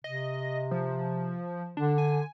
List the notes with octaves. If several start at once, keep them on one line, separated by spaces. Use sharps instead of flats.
C3 D#5
F3
D3 D4
G#5